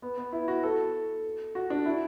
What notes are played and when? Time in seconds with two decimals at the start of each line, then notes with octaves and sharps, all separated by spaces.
0.02 B3
0.17 B3
0.33 E4
0.48 F#4
0.63 A4
1.55 F#4
1.70 D4
1.86 E4